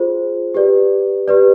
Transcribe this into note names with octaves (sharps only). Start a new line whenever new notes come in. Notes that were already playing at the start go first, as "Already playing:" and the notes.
Already playing: F4 G#4 C5
G4 B4 D5
G4 B4 D5